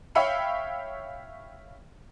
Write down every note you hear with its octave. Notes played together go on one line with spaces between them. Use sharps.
C#5 E5 F5 G5 B5 C#7